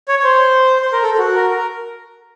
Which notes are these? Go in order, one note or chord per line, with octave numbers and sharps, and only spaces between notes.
C#5
C#5
C5
C5
A#4
A4
A4
F#4
A#4
A#4